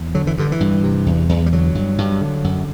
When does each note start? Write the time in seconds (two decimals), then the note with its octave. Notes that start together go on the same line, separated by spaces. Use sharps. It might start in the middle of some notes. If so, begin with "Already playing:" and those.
Already playing: E2
0.15 D3 F#3
0.27 E3
0.38 G2 D3
0.52 E3
0.60 G2
0.84 C3
1.06 E2
1.29 E2
1.46 G3
1.53 D3 F#3
1.75 G2
1.98 G2
2.21 D3
2.44 F#2